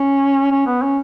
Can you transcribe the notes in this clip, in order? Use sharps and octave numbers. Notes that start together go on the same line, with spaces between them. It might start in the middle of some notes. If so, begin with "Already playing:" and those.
Already playing: C#4
C#4
B3
C#4